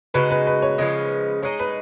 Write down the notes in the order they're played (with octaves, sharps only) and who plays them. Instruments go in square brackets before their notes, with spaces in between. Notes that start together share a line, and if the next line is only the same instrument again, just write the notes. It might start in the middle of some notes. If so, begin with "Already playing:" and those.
[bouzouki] C#3 G#3 D#4 F#4 [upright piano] B4
[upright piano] B4
B4
C#5
[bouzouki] C#3 F3 G#3 B3 [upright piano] D#5
[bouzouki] G#3 D#4 G#4 [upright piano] C#5
[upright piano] B4